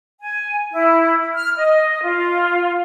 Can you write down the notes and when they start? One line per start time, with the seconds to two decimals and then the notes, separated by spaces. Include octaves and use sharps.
0.20 G#5
0.71 E4
1.34 F6
1.57 D#5
2.02 F4